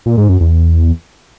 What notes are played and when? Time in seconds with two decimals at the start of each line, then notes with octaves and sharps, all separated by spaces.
0.06 A#2
0.18 G#2
0.29 F#2
0.41 E2